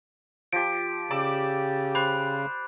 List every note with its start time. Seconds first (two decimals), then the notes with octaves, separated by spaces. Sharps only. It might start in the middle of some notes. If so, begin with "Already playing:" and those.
0.53 F3 G4 D7
1.11 C#3 G4 D5 D6 E6
1.95 C5 B5 F#6